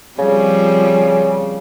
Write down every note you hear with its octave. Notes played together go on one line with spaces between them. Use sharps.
C#3 F3 G3 C4